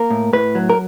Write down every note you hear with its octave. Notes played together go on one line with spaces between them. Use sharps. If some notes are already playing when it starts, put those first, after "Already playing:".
Already playing: A#3 A#4
A2
A2 B4
F#3
A#4